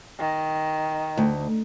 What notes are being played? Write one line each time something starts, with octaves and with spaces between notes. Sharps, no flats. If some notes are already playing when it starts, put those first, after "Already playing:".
D#3
D2